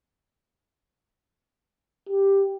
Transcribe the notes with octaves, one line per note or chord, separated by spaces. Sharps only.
G4